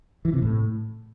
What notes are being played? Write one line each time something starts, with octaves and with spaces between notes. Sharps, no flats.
E3
C3
A2